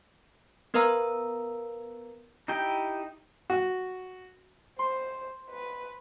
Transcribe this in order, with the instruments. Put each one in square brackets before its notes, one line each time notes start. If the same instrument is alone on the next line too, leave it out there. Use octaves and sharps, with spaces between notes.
[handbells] B3 A#4 B4 F5 A#5 E6
[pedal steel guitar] D#4 E4 G4 G5
[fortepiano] F#4
[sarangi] C5 [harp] C6
[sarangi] B4